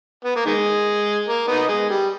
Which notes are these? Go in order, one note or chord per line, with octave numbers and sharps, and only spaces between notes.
B3
A#3
D#3 G#3
A#3
B3 D#4
G#3
G3